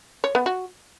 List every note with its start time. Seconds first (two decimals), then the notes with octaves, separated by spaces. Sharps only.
0.24 C#5
0.35 B3
0.46 F#4